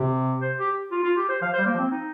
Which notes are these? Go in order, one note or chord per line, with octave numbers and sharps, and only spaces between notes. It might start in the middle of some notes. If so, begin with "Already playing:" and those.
Already playing: C3
C5
G4
F4
F4
G4
C5
F3 F5
C5
G3
A#3
F3
C4
D#4